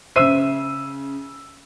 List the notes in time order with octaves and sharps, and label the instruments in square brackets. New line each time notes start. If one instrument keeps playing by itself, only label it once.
[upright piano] C#3 E6 D#7 [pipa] C5 E5